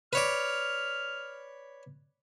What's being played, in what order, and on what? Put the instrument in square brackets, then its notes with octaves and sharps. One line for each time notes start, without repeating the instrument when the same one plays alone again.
[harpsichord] B4 C#5 D5 [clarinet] F6